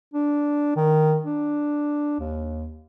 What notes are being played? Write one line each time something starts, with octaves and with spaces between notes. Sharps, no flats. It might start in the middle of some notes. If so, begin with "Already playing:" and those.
D4
D#3
D4
D#2